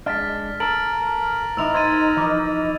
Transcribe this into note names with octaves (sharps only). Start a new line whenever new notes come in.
G#3 D4 F6 A6 B6
A4 A#4 A6 D7 F#7
A2 E3 D#4 E4 D#5 E6 F7
C5 G#6 A6 D#7
E3 F3